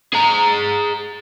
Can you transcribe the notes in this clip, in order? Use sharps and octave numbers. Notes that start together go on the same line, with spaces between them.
G#4 A#5